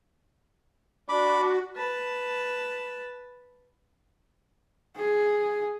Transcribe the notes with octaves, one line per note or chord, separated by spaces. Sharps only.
D4 F#4 B5 D6
B4 A5
G#4